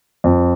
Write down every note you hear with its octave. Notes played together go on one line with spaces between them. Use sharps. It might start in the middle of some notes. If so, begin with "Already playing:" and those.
F2